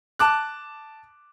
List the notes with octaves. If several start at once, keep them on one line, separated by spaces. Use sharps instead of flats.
A5 D6 F#6